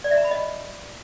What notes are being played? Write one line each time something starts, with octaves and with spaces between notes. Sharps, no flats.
D5
E5
A#5
B5
D#5